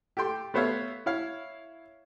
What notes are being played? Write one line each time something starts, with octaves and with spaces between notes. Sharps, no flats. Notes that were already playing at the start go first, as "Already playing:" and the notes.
G4 A4 G5 C6
A3 B3 C5 C#5 E5 F5
E4 C#5 F5